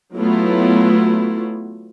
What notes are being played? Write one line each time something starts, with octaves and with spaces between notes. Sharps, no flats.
F#3 A3 B3 E4 F4